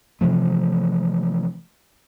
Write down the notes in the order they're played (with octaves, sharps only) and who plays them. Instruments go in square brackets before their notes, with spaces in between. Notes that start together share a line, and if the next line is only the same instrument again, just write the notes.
[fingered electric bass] C3 E3 F3 A3